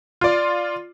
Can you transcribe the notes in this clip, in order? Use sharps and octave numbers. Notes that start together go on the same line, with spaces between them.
F4 D5